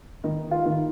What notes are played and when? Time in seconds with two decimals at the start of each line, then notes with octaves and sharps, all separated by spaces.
0.24 D#3 D#4
0.51 F4
0.66 D#3